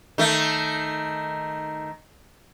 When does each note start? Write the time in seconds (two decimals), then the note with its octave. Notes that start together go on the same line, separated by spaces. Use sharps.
0.18 D#3 A3